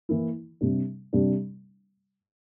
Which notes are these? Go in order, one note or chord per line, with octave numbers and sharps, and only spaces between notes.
E3 A#3 E4
C3 G3 D4
C3 G3 D4